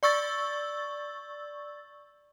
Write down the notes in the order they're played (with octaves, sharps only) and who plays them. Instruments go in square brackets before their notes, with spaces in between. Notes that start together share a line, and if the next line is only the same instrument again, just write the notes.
[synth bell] D5 C#6 E6 A6